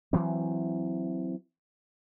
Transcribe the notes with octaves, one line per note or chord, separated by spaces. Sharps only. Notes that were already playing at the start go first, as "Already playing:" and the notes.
E3 F#3 C4